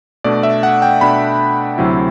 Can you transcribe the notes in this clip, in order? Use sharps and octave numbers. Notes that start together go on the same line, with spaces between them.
B2 A3 D4 D5
E5
F#5
G5
B2 A3 D4 B5
D2 C3 F#3 C4 E4